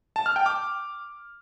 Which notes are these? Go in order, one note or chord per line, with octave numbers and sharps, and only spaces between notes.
A5
F6
G5
D6